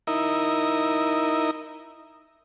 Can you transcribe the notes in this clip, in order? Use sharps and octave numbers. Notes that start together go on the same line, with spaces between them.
D#4 E4 A#4